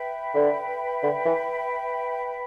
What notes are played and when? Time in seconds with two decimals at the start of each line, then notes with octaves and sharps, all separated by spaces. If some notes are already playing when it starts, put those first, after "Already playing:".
Already playing: B4 E5 G5 B5
0.35 D3
1.03 D3
1.26 E3